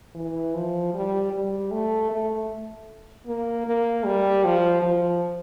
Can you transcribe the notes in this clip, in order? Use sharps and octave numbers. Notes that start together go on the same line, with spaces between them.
E3
F3
G3
G3
A3
A3
A#3
A#3
G3
F3
F3